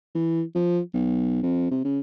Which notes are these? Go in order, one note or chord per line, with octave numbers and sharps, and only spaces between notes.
E3
F3
B1
F2
C3
C#3